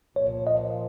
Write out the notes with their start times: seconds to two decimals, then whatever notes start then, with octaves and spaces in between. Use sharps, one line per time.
0.16 A#2 F3 A#3 C#5
0.47 D#5